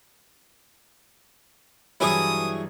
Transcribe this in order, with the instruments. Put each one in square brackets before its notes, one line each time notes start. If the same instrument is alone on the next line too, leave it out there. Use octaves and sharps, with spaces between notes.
[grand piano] G2 E3 F#3 [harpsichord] E4 G#4 C#5 [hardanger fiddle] D#6